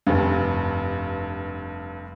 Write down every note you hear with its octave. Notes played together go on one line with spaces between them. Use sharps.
F1 G2